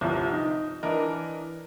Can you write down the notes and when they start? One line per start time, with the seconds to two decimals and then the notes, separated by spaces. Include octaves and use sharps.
0.01 G1 C2 C3 F3
0.32 D#4
0.83 E3 D4 A#4 D#5